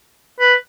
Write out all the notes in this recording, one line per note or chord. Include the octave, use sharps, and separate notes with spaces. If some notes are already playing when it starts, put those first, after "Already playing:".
B4